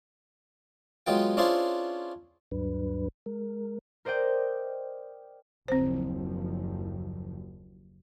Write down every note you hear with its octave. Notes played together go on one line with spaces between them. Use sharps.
F#3 G#3 B3 F4 G5
C#4 D4 E4 F4 G#4 C5
D2 G2 F#3 D4 B4
G#3 A#4
A#4 C5 D5 D#5 G5
F#1 D#2 F3 C4 C5